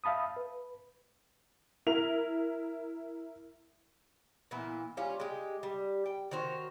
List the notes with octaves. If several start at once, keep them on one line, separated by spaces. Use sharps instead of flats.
E5 F5 A5 B5 D#6
B4
E4 A#4 F7
A#2 E3 B3 E4
G3 C#4 F4
G#3 G4
G3
G5
D#3 F#4 C5 C#5